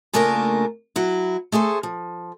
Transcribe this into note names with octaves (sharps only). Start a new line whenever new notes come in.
C#3 A3 A#3 D4 F4 A#4
F#3 E4
A3 G#4 A4 C5
F3